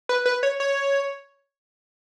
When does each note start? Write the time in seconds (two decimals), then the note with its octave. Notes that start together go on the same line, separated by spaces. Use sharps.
0.09 B4
0.26 B4
0.43 C#5
0.60 C#5